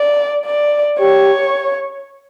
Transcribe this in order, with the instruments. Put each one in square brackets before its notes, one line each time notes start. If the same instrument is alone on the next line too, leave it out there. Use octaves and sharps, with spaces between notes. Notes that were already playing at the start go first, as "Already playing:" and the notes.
Already playing: [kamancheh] D5
D5
[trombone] G4 [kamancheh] C#5